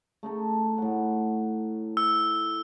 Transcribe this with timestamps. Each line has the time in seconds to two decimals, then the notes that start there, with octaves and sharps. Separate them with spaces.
0.23 A3 D#4 A4
0.78 A2 F#5
1.97 E6